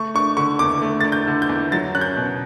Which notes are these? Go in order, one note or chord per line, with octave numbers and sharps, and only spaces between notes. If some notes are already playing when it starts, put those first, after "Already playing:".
Already playing: A3 C#6
D4 C#6
D3 C#6
E2 D6
A3
D4 A6
G6
D3
G6
E2
F#3 A6
C#4 F#6
G6
B2